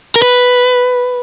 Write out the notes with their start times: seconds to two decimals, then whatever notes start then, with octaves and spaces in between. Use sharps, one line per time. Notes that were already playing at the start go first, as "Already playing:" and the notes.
0.16 A#4
0.22 B4